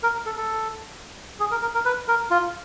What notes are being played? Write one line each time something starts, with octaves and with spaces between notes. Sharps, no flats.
A#4
A4
A4
G#4
A#4
A#4
A#4
B4
A#4
F4